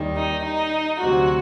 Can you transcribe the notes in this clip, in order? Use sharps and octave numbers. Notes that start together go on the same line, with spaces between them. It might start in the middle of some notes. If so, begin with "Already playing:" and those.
Already playing: D#2 D#3 G3
D#4
D#4
D2 C3 F#3 F#4